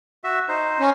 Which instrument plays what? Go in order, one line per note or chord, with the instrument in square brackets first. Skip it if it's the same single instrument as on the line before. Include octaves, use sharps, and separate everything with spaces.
[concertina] F#4 E5
D#4 C5
[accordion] C#4